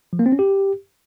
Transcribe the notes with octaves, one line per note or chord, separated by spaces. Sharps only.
F3
A#3
C4
C#4
G4